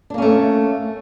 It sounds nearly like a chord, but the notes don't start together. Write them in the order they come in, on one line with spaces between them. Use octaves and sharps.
D4 A#3 C#4 A3